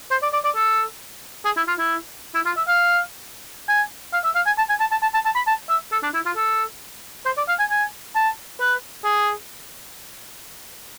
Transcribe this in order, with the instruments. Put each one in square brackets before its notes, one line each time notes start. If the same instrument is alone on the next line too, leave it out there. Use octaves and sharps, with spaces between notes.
[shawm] C5
D5
D5
D5
A4
G#4
E4
F4
E4
E4
F4
E5
F5
G#5
F5
E5
F5
G#5
A5
G#5
A5
A5
A5
A5
A5
B5
A5
E5
A4
D4
E4
F4
A4
C5
D5
F5
G#5
G#5
A5
B4
G#4